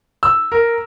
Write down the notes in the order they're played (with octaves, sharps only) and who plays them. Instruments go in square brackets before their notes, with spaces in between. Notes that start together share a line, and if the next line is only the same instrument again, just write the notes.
[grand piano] E6
A#4